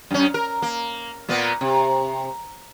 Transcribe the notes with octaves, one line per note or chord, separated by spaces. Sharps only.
F#2 C#4
A#4
A#3
A#2 A#3 B3
C3